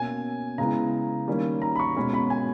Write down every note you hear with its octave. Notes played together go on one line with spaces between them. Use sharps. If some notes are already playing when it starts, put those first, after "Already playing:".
Already playing: B2 A#3 C#4 G#5
C#3 G#3 B3 E4 A#5
D#3 G3 A#3 C#4
A#5
B5
C#6
B2 G#3 C#4 B5
B5
G#5